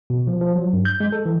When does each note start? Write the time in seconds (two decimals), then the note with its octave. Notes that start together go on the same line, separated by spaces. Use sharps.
0.10 B2
0.27 F3
0.41 F3
0.56 F#3
0.73 G2
0.85 G6
1.00 G#3
1.12 A4
1.26 E3